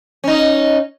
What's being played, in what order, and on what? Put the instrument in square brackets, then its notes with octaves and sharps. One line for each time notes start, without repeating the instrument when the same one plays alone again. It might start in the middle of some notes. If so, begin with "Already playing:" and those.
[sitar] C#4 D#4